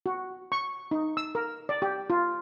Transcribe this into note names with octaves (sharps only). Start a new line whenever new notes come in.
F#4
C#6
D#4
E6
A#4
D5
G4
F4